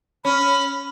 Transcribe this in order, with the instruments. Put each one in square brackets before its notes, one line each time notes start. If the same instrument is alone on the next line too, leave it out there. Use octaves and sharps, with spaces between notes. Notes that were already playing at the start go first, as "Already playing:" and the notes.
[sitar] C#4 [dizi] B5